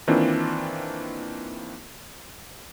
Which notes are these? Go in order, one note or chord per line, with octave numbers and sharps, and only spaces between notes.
D#3 E3 A#3 C4 D4 F4